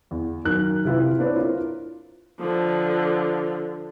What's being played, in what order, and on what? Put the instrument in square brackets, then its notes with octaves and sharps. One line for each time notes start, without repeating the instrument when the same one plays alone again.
[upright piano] E2
F#2 D#3 A#4 F#6
C3 E4 F4 B4
A#3 C4 D4 B4 C#5
E4 F4 A#4 C5
[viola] D3 F3